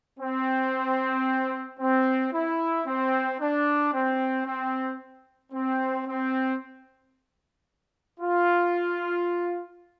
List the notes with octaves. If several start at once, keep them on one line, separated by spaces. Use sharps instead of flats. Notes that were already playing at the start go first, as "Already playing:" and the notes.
C4
C4
E4
C4
D4
C4
C4
C4
C4
F4